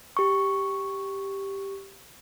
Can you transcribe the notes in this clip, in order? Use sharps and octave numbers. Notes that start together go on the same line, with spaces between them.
G4 C#6